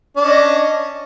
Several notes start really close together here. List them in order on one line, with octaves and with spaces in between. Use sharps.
D4 C#4 D#5